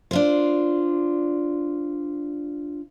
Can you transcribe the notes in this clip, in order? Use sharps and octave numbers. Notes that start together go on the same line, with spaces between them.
D4 F4 C5